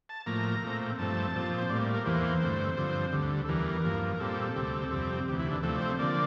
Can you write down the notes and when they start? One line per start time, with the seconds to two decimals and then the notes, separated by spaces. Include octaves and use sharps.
0.09 A5
0.26 A2 F3 A#3 A#5
0.62 A#2 A3 C4
0.99 G2 F3 A3 C4 A5
1.35 A#2 F3 C4
1.58 C5
1.69 A2 G3 A#3 D5
1.94 A#4
2.05 E2 E3 A#3 C5
2.41 G2 D3 A3 C4
2.77 G2 D3 F3 C4
3.13 D2 D3 G3
3.45 A4
3.48 E2 E3 G3 A#4
3.84 G2 F3 A#3
4.14 A#4
4.20 A#2 G3 C4 A4
4.56 D2 C3 G3 C4
4.91 F2 C3 G3 C4
5.28 D2 C3 E3 G4
5.39 E4
5.51 D4
5.63 C3 F3 A3 C4 A4
5.76 D5
5.81 C5
5.99 D3 F3 A#3 D5